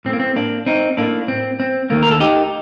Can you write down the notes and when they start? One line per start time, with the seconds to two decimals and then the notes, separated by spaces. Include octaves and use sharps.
0.05 A2 C4
0.09 A3 A#3
0.20 C4
0.36 A#3 D4
0.66 C4 D#4
0.97 A2 A3 A#3 D4
1.28 C4
1.60 C4
1.90 D#2 D#3 A3 A#3
2.03 A#4
2.11 A4
2.20 D#4 G4